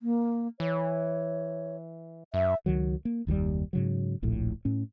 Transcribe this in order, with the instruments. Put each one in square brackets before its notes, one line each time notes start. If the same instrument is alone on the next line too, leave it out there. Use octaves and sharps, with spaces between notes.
[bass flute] A#3
[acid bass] E3 [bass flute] C#5
[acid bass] F#2 [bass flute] E5
[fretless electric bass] C#2 D#3 F#3
A#3
F#1 D#2 D#3 G3
G#2 C#3 F#3
D1 A#1 A2
A2 C#4